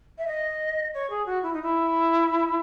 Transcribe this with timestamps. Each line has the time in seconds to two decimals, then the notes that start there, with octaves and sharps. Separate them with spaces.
0.18 E5
0.27 D#5
0.94 C#5
1.10 G#4
1.26 F#4
1.43 E4
1.53 D#4
1.62 E4